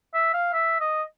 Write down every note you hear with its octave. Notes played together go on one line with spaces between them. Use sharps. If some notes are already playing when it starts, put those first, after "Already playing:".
E5
F5
E5
D#5